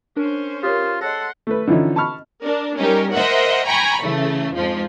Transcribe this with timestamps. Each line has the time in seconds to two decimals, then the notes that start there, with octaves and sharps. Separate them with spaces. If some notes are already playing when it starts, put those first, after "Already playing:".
0.17 C#4 D4 A#4 C5
0.63 F4 G4 A#4 C#5 D#6
1.01 G#4 A4 C#5 D#5 F#5 C6 A#6
1.47 A3 B4
1.67 D3 E3 F3 C#4 D#4
1.96 A5 B5 C#6 F6
2.43 D4 A#4
2.78 G3 C#4 D#4 G4 A#4
3.13 A#4 C5 D#5 E5 F#5
3.66 G5 G#5 A#5 B5 C#6
4.03 C#3 E3 A3
4.55 F2 G#2 F3 G#3